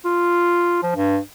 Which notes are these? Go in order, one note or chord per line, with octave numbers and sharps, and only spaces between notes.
F4
F3
G2